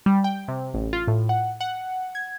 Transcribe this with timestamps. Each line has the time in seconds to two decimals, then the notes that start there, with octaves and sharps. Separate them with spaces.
0.06 G3
0.24 G5
0.48 C3
0.74 A1
0.93 F4
1.08 A2
1.29 F#5
1.61 F#5
2.15 G#6